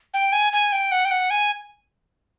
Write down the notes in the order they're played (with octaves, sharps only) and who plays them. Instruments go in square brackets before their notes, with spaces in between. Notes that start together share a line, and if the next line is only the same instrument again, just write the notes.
[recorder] G5
G#5
G#5
G5
F#5
G5
F#5
G#5